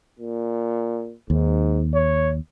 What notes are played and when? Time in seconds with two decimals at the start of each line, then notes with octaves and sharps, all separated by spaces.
0.19 A#2
1.30 D#2 G#2
1.94 C#5